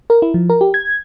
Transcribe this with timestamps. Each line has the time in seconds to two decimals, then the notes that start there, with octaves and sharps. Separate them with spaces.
0.10 A#4
0.22 E4
0.34 F3
0.49 A#4
0.61 G4
0.74 G#6